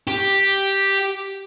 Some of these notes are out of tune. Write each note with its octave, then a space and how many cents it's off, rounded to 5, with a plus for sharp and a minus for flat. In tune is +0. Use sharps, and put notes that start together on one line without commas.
G4 +0